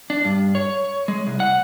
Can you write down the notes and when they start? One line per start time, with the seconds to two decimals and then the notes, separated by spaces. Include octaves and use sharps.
0.10 D4
0.25 G2
0.55 C#5
1.08 G#3
1.27 C2
1.40 F#5